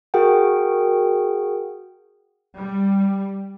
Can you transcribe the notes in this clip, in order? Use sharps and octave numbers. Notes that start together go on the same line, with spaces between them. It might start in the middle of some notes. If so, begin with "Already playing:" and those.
F#4 G#4 A#4 F#5 G5
G3